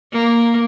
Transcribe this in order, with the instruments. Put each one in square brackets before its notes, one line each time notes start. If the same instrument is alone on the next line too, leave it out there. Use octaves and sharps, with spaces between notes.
[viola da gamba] A#3